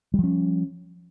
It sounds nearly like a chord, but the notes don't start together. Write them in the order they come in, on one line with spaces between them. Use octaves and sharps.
G3 F3 C#4